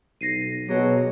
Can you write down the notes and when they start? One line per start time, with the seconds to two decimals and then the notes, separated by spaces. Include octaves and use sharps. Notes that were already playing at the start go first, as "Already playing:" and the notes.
0.21 B1 A#6 C7 D#7
0.69 B2 F#3 B3 G#4